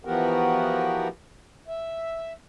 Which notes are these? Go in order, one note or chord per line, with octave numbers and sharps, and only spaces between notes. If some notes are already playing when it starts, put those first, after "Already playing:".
E3 F3 B3 F#4 G4 A#4
E5